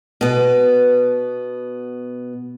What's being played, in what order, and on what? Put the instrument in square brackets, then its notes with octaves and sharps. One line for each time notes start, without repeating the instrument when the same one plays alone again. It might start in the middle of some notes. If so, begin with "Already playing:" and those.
[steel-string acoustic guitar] B2 B3